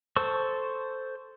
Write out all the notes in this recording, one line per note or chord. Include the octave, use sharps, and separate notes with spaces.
A4 C5 C#6 E6